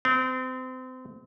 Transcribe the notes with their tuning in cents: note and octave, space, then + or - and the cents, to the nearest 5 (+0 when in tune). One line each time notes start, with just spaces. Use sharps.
C4 -30